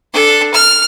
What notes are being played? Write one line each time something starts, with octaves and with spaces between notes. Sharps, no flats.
D4 A4
F6